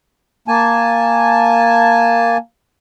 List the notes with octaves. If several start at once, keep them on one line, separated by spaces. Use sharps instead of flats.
A#3 G#5 A5